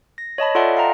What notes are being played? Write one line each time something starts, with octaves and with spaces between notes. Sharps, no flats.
A#6
C#5 D#5 A5 B5
F4 A4 D5 E5 F#5 A5
D#5 F5 G5 A#5